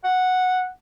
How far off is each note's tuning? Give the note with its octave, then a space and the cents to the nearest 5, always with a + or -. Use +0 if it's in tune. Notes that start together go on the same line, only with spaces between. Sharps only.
F#5 -5